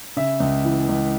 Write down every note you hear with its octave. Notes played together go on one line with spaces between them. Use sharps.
C#3 E5
C#2
E3
C#2